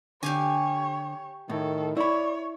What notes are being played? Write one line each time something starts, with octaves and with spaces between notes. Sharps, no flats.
D3 G4 C#5 F5 G#5
A2 D#3 A4
E4 C#5 D5 B5